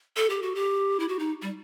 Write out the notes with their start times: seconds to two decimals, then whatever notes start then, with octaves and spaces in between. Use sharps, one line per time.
0.17 A4
0.30 G4
0.42 F#4
0.55 G4
1.00 E4
1.08 F#4
1.19 D#4
1.42 G3